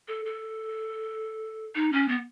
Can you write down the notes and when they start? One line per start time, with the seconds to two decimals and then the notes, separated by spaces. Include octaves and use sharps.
0.08 A4
0.25 A4
1.75 D#4
1.92 C#4
2.08 B3